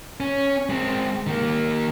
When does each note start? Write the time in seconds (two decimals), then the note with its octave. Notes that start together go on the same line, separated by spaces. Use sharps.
0.20 C#4
0.70 G#3 C4
1.27 D#3 A#3